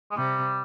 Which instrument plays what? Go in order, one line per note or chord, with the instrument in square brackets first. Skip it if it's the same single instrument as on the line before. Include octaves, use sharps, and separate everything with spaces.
[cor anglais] G#3
[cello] C3 [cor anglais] G3